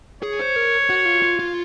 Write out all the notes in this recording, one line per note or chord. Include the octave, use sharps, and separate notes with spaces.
G#4 C#5
C5
A#4
F#4
F4
F4
F4